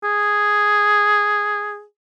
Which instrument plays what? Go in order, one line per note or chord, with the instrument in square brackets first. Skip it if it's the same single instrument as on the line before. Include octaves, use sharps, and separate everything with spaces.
[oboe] G#4